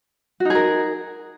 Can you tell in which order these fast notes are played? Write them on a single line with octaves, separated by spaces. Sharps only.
F#4 D#4 G#4 A#4